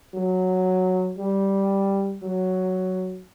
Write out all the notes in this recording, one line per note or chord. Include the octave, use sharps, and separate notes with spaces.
F#3
G3
F#3